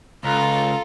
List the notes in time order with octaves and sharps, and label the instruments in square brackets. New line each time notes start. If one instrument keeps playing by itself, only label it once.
[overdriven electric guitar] C#2 [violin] F4 A4 [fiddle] A#5